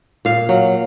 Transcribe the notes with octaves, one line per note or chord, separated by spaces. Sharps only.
A#2 F5
F#3